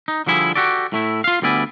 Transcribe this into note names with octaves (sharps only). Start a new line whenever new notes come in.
D#4
D3 F3 G3 E4 G4 G#4
F#4 G4 A4 D5
A2 A3 E4
F4 F5
D2 G3 B3 D5 E5 G#5